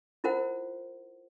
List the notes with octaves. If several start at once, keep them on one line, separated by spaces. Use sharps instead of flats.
E4 F4 A#4 C5 F#5